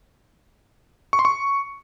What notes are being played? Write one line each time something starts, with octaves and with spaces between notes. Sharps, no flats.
C#6
C6
C#6